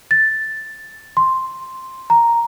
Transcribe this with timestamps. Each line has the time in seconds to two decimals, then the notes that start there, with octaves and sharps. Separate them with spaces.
0.11 A6
1.17 C6
2.10 A#5